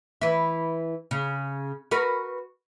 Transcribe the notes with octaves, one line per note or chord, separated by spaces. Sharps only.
E3 E4
C#3
F#4 A#4 B4